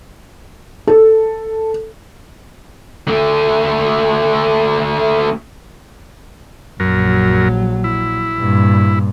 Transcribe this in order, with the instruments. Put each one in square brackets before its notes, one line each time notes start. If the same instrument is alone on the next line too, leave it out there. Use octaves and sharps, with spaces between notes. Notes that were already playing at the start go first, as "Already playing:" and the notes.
[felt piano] A4
[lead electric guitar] D3 A3
[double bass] A#1 F#3 [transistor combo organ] F#2 A#4
[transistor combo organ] E4
[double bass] G2 A#2